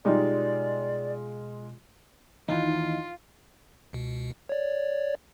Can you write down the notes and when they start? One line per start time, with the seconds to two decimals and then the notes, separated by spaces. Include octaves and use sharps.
0.05 B2 G3 G#3 D#4 F4 D5
2.49 D#2 E3 D#4 F4
3.93 C#2 B2
4.49 C#5 D5